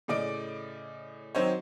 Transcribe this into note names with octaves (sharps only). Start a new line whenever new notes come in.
A2 C#3 D5 D#5 D7
D#3 F#3 C4 D#4 C5 C#5